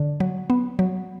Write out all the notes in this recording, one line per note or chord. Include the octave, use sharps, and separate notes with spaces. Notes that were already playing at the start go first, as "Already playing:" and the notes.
Already playing: D3
F#3
B3
F#3